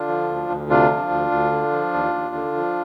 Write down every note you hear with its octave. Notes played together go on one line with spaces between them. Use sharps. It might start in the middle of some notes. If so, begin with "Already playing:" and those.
Already playing: D3 D4 F4
F3
D2
D2
C3 D4 F4
F3
D2
D2
D3
F3
D#2
D#2
D3
F3